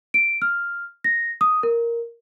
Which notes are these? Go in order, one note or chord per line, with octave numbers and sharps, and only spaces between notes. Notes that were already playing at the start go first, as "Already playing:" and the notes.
D7
F6
A#6
D#6
A#4